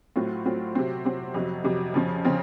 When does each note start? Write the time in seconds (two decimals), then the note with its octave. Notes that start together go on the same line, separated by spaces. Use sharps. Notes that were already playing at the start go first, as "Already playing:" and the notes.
0.16 A2 F#3 C4 F4
0.45 A2 F#3 C4 F4
0.75 C3 F#3 C4
1.05 C3 F#3 C4
1.34 F2 C3 F#3
1.64 F2 C3 F#3
1.94 F2 C#3 F3 C4
2.25 C#3 F3 C4